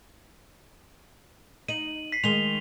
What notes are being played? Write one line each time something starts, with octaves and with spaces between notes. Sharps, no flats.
D#4 D#7 F#7
B6 C7
D#3 G#3 F7 G7